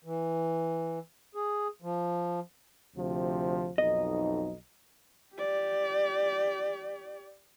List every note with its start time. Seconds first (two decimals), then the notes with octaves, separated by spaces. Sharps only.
0.05 E3
1.35 G#4
1.82 F3
2.97 D2 C3 F3
3.78 B1 F2 D#4 D#5
5.36 G4 D5